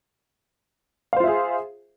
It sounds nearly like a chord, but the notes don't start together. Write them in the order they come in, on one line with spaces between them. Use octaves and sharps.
F5 C5 F4 E5 G#4